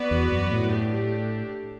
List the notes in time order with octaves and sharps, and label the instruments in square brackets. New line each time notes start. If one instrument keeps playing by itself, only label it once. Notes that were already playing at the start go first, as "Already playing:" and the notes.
Already playing: [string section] B3 F#4 B4 D5
[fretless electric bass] E2
F#2
A2
[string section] A3 D4 G4